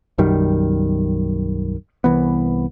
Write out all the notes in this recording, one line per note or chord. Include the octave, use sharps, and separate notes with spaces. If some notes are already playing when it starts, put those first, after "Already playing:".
B1 F#2 D#3 G3
C2 E3 B3